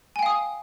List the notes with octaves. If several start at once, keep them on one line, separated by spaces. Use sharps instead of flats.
F5 G5 G#5 D#6